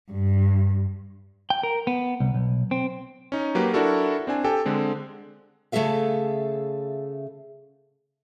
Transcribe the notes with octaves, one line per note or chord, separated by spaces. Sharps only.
G2
G5
A#4
B3
C2
B1
C4
C#4 D#4
F#3 A#3 G4 B4
D4 E4 F#4 A4 A#4
C4 D4 G#5
G4 A4 G5 G#5
D3 G#3 C4
C#3 A3 G#4 A4 E5 F5